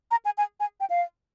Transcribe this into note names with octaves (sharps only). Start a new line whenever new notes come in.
A#5
G#5
G#5
G#5
G5
F5